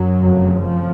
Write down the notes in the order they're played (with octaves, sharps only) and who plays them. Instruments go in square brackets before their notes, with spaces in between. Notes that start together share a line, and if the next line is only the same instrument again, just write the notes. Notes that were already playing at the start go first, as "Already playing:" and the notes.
Already playing: [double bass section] F#2 F#3
F1 F2 C#3
F2 F3